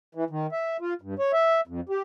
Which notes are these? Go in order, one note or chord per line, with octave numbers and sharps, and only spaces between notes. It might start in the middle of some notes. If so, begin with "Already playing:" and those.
E3
D#3
E5
F4
G2
C#5
E5
F2
G4